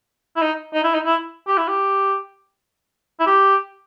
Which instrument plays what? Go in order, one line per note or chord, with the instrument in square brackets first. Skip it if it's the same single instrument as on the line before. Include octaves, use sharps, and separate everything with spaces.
[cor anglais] E4
D#4
D#4
E4
D#4
E4
G4
E4
G4
E4
G4